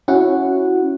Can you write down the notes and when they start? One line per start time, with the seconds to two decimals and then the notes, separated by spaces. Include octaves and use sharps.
0.08 C#4 E4 F#4 F#5